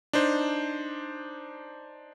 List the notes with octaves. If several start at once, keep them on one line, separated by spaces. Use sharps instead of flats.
D4 D#4 C5